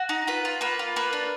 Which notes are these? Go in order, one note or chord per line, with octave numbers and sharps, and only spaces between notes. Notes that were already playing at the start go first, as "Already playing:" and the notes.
Already playing: F#4
D#4
F4 B4
F4
A#3 B4
F4
A#3 B4
D4